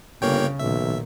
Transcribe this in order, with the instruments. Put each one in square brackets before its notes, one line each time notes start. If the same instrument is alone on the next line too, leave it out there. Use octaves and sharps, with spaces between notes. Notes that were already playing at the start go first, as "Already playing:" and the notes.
[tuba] G1 [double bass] C#3 [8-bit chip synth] A#3 C#5 G5
[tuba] B1 [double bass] A#2 D#3 [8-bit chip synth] E5